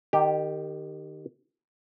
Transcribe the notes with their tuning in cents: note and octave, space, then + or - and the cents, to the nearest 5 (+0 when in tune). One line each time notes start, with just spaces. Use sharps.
D#3 -25 G4 +0